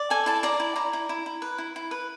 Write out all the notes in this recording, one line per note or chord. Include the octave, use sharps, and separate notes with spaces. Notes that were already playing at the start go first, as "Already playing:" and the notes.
Already playing: D5
A4 G#5
E4 A5
D5 A#5
E4
E4 A#5
E4
E4
E4
B4
E4
E4
B4